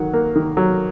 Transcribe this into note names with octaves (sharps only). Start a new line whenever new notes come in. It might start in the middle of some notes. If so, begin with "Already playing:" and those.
Already playing: D#3 F#3 F#5
A#3
D#3
F#3